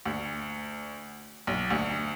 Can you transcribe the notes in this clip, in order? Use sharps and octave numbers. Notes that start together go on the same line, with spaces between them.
D2
B1
D2